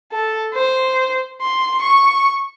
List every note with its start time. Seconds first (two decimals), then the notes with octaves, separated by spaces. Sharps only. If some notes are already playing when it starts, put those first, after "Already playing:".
0.12 A4
0.54 C5
1.42 C6
1.82 C#6